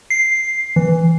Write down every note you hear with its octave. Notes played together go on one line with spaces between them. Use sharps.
C7
E3